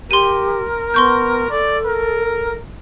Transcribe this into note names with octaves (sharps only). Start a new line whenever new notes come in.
G4 A#4 C6 D#7
B3 C6 C#6 G6
A4 D5
A#4